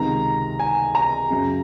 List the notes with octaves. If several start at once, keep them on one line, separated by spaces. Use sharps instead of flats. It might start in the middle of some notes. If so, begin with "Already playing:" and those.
Already playing: C#2 C3 D#3 A#5
G#5
A#5
F#2 C#3